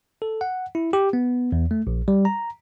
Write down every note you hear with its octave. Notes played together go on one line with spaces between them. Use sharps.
A4
F#5
E4
G4
B3
E2
A3
A#1
G3
A#5